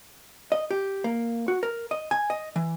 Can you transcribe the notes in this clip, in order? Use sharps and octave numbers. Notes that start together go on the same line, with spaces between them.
D#5
G4
A#3
F#4
A#4
D#5
G#5
D#5
E3